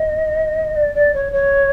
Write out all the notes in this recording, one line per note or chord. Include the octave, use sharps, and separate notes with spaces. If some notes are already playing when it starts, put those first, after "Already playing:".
Already playing: D#5
D5
D5
C#5
C#5